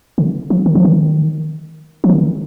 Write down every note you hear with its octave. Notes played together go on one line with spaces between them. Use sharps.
D3
F3
D#3
F3
D#3
F3
D#3